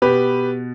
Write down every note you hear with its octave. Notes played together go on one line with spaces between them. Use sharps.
B2 G4 B4